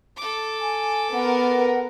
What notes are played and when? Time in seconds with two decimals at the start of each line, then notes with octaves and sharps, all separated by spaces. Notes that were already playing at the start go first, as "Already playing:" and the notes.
0.17 A4 D6
0.61 G#5
1.12 B3 A#4 F#5